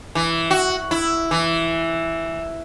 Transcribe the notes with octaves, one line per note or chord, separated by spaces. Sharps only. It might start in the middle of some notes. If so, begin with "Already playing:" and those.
E3
F#4
E4
E3